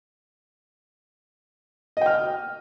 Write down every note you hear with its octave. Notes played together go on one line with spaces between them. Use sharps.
D#5 G5 F6